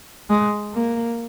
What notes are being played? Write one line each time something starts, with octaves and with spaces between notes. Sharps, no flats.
G#3
A#3